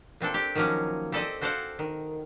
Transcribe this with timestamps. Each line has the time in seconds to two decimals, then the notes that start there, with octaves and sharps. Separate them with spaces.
0.21 A#2 C4 D4 A4
0.34 G4
0.55 D#3 F3 F#3 A#3 C#4
1.12 C4 G4 A4 C5 D5 D#5
1.41 F#4 A4 C5 D5 F5 F#5
1.79 D#3